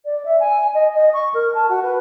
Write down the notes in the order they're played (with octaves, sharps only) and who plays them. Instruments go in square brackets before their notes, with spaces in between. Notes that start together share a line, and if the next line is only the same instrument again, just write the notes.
[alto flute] D5
E5
G#5
D#5
D#5
C#6
A#4
A5
F#4
B4